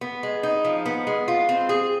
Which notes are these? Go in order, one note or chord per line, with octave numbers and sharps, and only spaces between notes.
B3
G#3
D#4
F3
B3
G#3
F4
C4
G#4